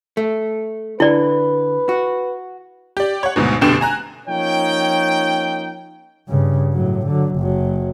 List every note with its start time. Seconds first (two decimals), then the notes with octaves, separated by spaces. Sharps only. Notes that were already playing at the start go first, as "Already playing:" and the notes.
0.17 A3
1.00 D3 E4 B4 D5
1.89 F#4
2.97 G4 D5
3.23 C#5 F#5
3.36 D2 G#2 B2
3.61 F1 B2 D3 D4 G5 E7
3.81 G#5 A#5 F#6
4.28 F3 A#3 C#4 D#4 C#5 G5
6.28 G2 C#3
6.74 A2 F#3
7.06 D3 F#3
7.36 F#1 F#3